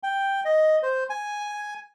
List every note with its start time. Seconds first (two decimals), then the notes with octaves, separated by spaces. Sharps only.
0.03 G5
0.45 D#5
0.82 C5
1.10 G#5